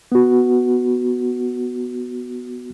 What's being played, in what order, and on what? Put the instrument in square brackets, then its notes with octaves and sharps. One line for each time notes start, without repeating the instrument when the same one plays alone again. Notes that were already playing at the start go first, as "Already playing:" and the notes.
[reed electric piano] B3 F#4